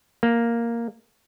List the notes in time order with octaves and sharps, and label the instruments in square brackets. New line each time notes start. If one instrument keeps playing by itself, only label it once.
[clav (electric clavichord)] A#3